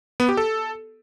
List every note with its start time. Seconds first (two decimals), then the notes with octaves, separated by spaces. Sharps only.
0.20 B3
0.29 G4
0.37 A4